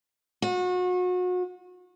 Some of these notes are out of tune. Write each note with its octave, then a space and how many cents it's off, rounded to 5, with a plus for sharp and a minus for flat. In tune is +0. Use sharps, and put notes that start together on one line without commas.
F#4 -35